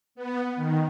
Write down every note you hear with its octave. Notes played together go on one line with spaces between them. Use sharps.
B3
D#3